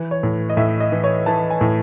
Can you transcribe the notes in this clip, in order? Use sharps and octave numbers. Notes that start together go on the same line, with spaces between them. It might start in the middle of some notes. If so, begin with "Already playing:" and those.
Already playing: E3 B4
C#5
A2
D#5
A2 E5
D#5
E3
C#5
E3 A5
G#5
A2